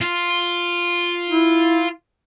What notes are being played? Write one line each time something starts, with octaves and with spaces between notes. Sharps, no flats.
F4
E4